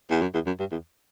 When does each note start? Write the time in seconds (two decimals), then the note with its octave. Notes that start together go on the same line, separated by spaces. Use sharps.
0.10 E2
0.22 F#2
0.34 E2
0.46 F#2
0.59 G2
0.72 E2